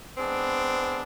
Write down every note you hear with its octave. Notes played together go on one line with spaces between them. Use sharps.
G#3 B3 C4 D4